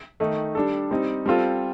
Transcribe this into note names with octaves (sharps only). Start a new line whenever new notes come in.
D#3 A3 D#4
G3 D4 A4
G3 C4 D#4
G3 C4 F4 A4